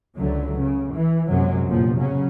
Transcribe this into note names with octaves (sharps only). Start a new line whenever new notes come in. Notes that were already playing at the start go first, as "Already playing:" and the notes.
C#2 D3 F#3 A3
C#3
E3
A#1 F#2 C3 F#3 G#3
F1 A#1 E2 A#2 F3
C#3 F#3 C#4